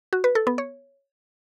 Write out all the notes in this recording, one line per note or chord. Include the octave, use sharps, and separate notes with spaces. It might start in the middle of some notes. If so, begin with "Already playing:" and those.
F#4
B4
A4
B3
C#5